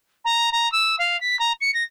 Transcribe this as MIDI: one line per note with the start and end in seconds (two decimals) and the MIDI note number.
0.24 0.49 82
0.52 0.70 82
0.72 0.96 88
0.98 1.19 77
1.20 1.38 95
1.39 1.52 82
1.60 1.71 97
1.74 1.83 94